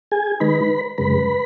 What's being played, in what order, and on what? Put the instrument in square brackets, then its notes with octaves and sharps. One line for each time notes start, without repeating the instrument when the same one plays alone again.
[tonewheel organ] G#4 G#5
D#3 G#3 D#4 B4 B5
F#2 C#3 G#3 B4 B5